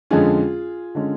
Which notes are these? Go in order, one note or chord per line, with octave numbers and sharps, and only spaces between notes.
F2 D3 G#3 C#4 F4 G#4
D3 G#3 C#4